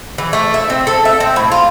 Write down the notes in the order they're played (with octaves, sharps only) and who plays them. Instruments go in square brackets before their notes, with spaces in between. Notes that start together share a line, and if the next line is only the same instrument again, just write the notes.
[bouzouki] E3
A3
E5
C4
A4
E5
C4
A2
F4